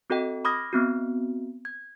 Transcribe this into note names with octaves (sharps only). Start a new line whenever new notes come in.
C4 F#4 A4 D#5 G5
B5 D6 D#6 F6 G#6 A#6
B3 C4 F#4
G#6